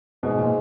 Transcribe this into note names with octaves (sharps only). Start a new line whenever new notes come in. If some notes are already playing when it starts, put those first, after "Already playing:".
G#2 B2
A#2